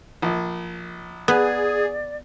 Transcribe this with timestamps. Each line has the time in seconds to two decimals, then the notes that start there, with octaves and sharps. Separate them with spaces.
0.22 A#1
1.28 B3 G#4 D5